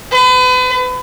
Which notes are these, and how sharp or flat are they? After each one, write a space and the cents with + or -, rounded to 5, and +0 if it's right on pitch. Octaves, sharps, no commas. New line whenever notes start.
B4 +35